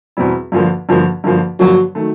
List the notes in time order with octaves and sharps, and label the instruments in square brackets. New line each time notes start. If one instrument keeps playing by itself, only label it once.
[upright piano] E2 B2 G3 C4 E4
G2 D3 F3 A#3
G2 D3 F3 A#3
G2 D3 F3 A#3
[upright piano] G2 D3 F3 A#3 [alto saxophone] F#3
[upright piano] D#3 F#3 A3